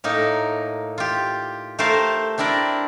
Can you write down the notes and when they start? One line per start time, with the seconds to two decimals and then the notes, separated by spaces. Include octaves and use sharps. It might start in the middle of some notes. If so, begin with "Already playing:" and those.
0.04 A2 A#3 D#4
0.98 F4 G4
1.79 A3 G4 A#4 C5 F5 A5
2.38 C4 D4 E4 A#4 D5